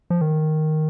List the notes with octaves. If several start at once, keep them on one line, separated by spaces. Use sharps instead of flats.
F3
D#3